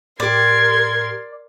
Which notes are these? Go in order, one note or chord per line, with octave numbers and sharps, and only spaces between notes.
A2 G4 A#4 D5 C6 G#6